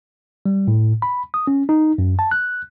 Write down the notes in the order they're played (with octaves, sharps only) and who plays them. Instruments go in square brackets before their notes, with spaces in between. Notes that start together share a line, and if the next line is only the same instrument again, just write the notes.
[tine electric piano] G3
A2
B5
D#6
C#4
D#4
F#2
A5
F#6